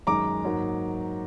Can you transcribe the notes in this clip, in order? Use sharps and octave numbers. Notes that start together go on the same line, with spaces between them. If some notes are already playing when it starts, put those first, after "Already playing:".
F#2 D#3 G#3 A#5 D6
G#2 F#3 A#3